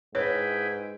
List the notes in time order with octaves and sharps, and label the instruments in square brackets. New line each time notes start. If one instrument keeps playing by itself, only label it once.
[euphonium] G#2 [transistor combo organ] E4 G#4 G5 [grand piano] B4 [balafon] C#5